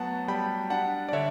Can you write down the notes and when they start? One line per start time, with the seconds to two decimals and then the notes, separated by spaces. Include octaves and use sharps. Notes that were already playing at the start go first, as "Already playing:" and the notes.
Already playing: F#3 A3 B3 F#5 A5
0.28 G3 G5 B5
0.70 D4 F#5 A5
1.09 D5
1.13 D3 C#5 E5